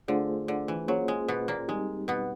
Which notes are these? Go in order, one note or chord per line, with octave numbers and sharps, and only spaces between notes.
D3 A3 D4 F4 G#4 C5
D3
E3
F#3 A#3 C#4 F4 G#4 C5
G#3
B2 B3
A#2 A#3
G3 G#3 C4 D#4 G4
B2 B3